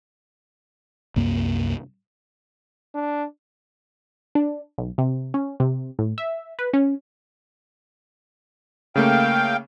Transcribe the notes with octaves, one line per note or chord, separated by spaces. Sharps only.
C2 F#2 A#3
D4
D4
B1
C3
C#4
C3
A2
E5
B4
C#4
C#3 A3 A#3 F5 G5